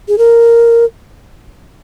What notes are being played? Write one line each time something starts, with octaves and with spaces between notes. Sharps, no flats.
G#4
A#4